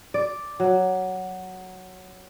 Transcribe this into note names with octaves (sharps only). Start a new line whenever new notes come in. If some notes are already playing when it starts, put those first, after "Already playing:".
D5
F#3